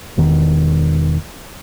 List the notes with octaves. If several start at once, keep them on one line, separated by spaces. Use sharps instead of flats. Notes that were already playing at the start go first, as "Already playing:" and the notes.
E1 E2 D#3